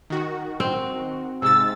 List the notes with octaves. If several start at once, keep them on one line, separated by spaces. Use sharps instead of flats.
D#3 F#4
C4
G#2 C3 E6 A6